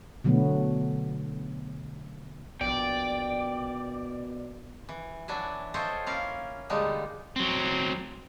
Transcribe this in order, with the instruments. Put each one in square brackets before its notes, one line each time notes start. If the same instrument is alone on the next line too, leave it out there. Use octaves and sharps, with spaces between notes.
[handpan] B2 D3 F#3 A3 B3
[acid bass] A#1 [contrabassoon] B2 [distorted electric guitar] D5 [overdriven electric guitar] G5
[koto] E3
E3 F#3 D4 E4 E5 G#5
F4 A4 C5 C#5 D#5 G5
A#3 C#4 E4 F4 A#4 F5
A#2 D3 G3 G#3 D#4 F4
[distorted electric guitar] F#3 C4